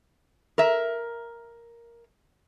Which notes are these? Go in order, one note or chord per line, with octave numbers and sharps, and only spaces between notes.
A#4 E5